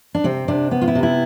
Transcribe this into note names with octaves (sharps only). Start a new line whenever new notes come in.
D4
C3 C4
C3 D4
B3
F4
E4
C3
E4